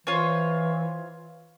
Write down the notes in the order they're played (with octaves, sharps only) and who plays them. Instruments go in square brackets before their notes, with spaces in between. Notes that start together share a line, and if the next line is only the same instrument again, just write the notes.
[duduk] E3 [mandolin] F4 C5 C#5